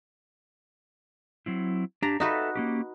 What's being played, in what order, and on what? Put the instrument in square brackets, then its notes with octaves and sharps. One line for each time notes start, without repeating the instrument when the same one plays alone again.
[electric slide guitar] F#3 C4 E4
[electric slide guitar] D4 G4 [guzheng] A#5
[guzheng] D#4 F#4 B4 [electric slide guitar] A4 E5
[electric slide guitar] A#3 C#4 G4